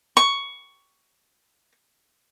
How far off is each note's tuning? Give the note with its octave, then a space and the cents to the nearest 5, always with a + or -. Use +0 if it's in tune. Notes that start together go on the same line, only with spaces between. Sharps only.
C#6 +10